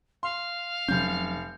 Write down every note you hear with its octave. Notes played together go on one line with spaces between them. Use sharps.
F5 C6
F1 C3 F#3 C#4 G6